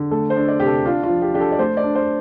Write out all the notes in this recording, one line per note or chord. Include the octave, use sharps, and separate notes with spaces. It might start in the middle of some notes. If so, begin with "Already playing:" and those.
Already playing: D3
A3 A4
C5
D4
D5
C3 G4
A4
D4 F4
F4
F3
G4
D4 G4
A4
D5
A3 C5
D5
D4
C5